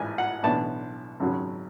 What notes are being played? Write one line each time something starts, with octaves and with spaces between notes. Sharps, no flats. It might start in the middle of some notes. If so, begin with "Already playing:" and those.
Already playing: A1 G#2 E3 G#5
F#5
B1 A2 E3 B3 D4 A5
G#1 F#2 C#3 F#3